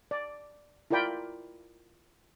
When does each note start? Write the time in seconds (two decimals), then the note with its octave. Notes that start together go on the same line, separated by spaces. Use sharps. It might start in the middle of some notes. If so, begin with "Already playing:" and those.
0.11 D5
0.91 E4 F4 A#4 D5 G5 B5